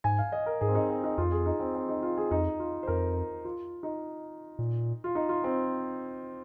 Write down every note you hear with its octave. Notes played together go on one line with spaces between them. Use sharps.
G#2 G#5
F5
D#5
A#4
G#2 G#4
C4
D#4
C4
D#4
F2 F4
G#4
D#4
C4
C4
D#4
F4
G#4
F2 D#4
F4
C5
F2 A#4
F4
D#4
A#2
F4
D#4
F4
C4